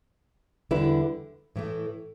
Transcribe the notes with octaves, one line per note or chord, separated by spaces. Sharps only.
E2 D3 G3 E4 B4
A2 E3 A3